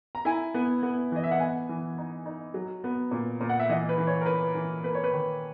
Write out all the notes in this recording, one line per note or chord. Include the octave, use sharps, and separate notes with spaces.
A#5
E4 G#5
B3
B3
E3 D#5
E5
F#5
B3 G#5
E3
D#4
D#4
F#3
B3
A#2
A#2
F#5
E5
E3 D#5
B4
E3
C#5
A#4
E3 B4
E3
A#3 B4
C#5
B4
D#3